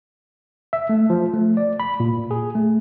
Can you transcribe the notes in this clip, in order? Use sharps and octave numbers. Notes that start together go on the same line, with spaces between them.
E5
A3
F3
A3
D5
B5
A#2
G#4
A3